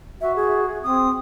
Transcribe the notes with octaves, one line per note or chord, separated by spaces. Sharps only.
F#4 E5
G#4
C4 D#6